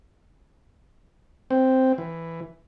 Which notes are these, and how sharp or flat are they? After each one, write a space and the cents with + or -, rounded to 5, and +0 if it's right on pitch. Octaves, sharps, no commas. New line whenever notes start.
C4 +0
E3 +5